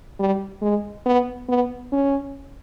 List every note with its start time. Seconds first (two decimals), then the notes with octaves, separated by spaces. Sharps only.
0.19 G3
0.62 G#3
1.06 B3
1.48 B3
1.92 C#4